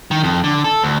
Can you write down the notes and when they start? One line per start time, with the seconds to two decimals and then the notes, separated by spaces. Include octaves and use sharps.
0.11 D#3
0.24 F2
0.44 D3
0.64 A4
0.83 D2